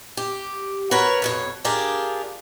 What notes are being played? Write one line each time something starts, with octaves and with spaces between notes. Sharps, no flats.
G4
F#4 A#4 B4 C#5
F2 B2 C#5
D4 F4 G4 G#4 A#4